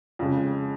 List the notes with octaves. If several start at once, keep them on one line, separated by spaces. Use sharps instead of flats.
F2 C#3 G#3